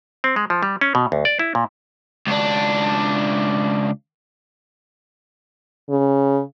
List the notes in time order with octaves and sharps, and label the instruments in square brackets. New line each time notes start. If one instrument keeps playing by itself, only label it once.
[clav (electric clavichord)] C4
G#3
F3
G3
C#4
B2
D2
D5
E4
A#2
[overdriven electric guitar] C#2 D4
[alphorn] C#3